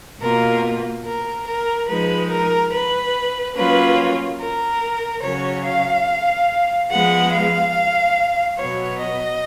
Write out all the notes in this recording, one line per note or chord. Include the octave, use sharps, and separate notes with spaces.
B2 A#3 F4 A#4
A#4
A#4
F3 G#3 D#4 B4
A#4
B4
F#3 A#3 C#4 F4 B4
A#4
C#3 F#3 C#4 C#5
F5
F3 G#3 B3 F#5
F5
B2 F#3 B3 C#5
D#5